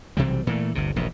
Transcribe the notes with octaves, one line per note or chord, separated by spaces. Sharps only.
B1 C3 E3 G3
A#2 E3 A3
G1 D2 C3
E1 A#1 G#2